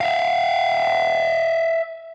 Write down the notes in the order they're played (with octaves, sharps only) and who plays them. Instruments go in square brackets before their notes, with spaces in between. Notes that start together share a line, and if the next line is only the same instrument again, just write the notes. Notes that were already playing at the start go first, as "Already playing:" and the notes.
[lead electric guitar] E5 F5